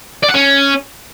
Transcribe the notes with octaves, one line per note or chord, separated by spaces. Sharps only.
D5
F#5
C#4